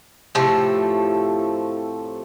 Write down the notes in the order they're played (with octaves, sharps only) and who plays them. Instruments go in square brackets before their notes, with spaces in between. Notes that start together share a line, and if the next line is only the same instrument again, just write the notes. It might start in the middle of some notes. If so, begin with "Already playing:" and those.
[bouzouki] A2 C3 F3 A3